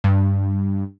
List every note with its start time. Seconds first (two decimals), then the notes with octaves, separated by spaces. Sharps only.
0.04 G2